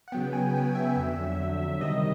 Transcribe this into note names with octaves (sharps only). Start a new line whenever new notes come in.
F#5
C#3 F#3 B3 G5
G#5
G5
E5
F2 D3 F#3
C3 D#3 G3 D#5